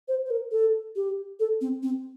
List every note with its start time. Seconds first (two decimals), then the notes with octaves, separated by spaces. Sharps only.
0.08 C5
0.26 C5
0.30 A#4
0.52 A4
0.96 G4
1.40 A4
1.61 C4
1.83 C4